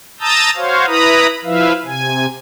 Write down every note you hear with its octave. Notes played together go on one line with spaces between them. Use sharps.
A5 A#5 D#6 E6 G6 A6
F#4 C5 C#5 F5
E4 B4 A#5 B5 D#6
F3 E4 B4 E5 F5
C3 G#5